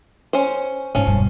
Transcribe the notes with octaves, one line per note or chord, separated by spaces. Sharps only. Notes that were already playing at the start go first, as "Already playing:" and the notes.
C#4 C5
G#2 F3 C#4 D4
E1 G2